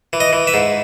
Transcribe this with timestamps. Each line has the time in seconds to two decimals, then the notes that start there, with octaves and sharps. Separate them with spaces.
0.13 E3
0.20 D#5
0.33 E3
0.47 E5
0.54 G#2